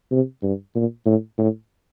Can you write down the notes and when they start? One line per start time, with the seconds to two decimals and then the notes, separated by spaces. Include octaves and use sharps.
0.11 C3
0.43 G2
0.75 A#2
1.06 A2
1.38 A2